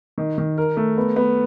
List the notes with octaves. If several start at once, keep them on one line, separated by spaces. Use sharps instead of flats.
D#3
D#3
A#4
A3
B3
B3